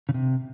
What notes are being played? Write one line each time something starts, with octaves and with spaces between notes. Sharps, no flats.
C#3
C3